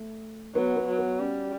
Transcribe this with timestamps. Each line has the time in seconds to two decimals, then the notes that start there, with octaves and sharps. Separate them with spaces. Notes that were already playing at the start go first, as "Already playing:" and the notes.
Already playing: A3
0.55 F#3 B3
0.76 B3
0.88 F#3
0.98 B3
1.19 G3 C#4